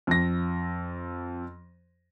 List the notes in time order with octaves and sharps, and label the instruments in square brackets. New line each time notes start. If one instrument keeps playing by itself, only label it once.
[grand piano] F2 A#6